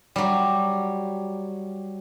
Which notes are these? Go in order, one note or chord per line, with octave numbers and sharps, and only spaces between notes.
F#3 G3